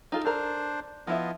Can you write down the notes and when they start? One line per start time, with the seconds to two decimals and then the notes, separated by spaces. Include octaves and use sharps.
0.12 D#4 F4 A4
0.25 D4 A4 A#4 C5
1.07 F3 B3 E4 F4 D#5 E5